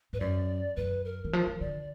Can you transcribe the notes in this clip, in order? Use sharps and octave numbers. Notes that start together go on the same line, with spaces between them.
G#2 B4
F#2 D5
F#2 B4
A#4
D#3
F3
D#3
D3 D5